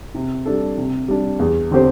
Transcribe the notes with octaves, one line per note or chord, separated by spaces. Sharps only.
C3
G3 D4 A4
C3
G3 D4
E2
D3 C4 G4 C5